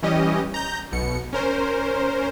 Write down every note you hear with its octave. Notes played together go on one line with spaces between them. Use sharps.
E3 G3 C#4 G4 D#5
A#5 G6
B1 B2 C#7
C#4 A#4 C5